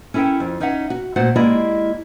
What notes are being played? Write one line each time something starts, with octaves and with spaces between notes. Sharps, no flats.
C#4 E4 A4 A#4 G5
F2
C#4 D#4 C#5 E5 F#5
F#4
A#2 A3 F#4 C5 F#5
G#3 A#3 E4 G4 D5 D#5